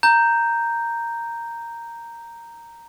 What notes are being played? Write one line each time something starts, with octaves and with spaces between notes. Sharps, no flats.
A#5 G6